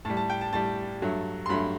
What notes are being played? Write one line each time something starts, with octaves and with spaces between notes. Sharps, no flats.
A2 G3 A5
A5
G5
A5
A2 G3 A5
G2 F#3 A3
C6
G2 F#3 A3 B5